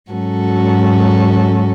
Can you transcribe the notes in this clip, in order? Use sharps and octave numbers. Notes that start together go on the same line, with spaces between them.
G#2 F#3 C#4 F#4 A4